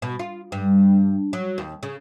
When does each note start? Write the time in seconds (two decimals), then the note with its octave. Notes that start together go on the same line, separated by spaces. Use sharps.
0.02 B2
0.19 F4
0.52 G2
1.33 F#3
1.58 D#2
1.83 C#3